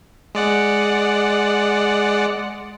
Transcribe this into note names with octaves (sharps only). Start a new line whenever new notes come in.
G#3 D5 F#5